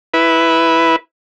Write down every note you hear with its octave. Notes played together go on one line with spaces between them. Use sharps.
E4 B4